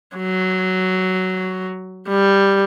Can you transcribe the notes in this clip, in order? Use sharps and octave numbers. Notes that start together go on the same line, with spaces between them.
F#3
G3